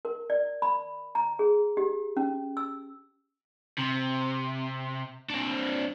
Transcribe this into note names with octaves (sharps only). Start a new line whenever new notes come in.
A#4
D5
B5
A#5
G#4
G4
C#4
E6
C3
C4 D4